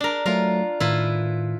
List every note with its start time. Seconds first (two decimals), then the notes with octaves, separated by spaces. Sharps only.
0.01 D4 A#4
0.26 F#3 A3 F4 A#4
0.80 A2 D#3 E4 F4 B4